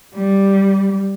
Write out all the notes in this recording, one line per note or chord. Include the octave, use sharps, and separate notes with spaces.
G3